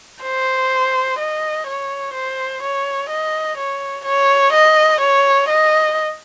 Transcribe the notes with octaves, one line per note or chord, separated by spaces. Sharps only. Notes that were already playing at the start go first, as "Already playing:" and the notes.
C5
D#5
C#5
C5
C#5
D#5
C#5
C#5
D#5
C#5
D#5